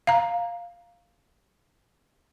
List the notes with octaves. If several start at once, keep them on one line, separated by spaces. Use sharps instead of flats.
F5 A#5